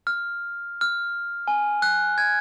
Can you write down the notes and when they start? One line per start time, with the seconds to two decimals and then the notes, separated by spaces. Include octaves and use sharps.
0.07 F6
0.81 F6
1.48 G#5
1.82 F#6
2.18 G#6